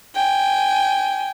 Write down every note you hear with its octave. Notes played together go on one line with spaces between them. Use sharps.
G5 G#5